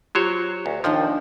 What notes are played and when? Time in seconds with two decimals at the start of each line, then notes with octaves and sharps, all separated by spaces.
0.15 F#3 F4 G4 C5 C#5
0.66 D2
0.84 D#2 D#3 F3 D4 D#4